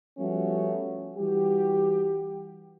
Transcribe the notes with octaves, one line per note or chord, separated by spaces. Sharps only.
F3 G3 A3 B3 C#4 F#4
E3 G3 F#4 G4